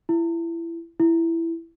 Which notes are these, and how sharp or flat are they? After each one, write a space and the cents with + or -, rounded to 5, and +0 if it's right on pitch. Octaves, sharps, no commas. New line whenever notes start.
E4 +25
E4 +10